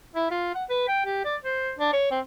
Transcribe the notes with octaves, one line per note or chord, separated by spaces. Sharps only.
E4
F4
F#5
B4
G5
G4
D5
C5
D4
C#5
C4